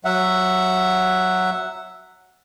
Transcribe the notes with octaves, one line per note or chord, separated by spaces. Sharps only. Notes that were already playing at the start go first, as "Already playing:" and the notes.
F#3 E5 F#5